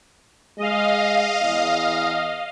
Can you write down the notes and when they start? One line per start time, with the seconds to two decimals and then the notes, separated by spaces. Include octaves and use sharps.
0.58 G#3 D#5 F5
1.41 E2